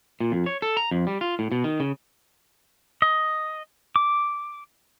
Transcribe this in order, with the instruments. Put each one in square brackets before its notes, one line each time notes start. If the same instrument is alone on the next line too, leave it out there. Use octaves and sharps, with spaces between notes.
[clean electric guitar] A#2
F2
C#5
A4
A#5
F2
G3
F4
A2
B2
D#3
C#3
[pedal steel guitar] D#5
D6